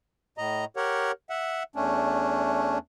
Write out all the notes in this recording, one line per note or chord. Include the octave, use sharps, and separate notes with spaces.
A2 D#5 A#5
G4 A#4 C#5 F#5
E5 F#5
E2 A3 C#4 D4